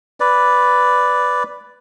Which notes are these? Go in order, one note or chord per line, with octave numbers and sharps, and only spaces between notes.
B4 D5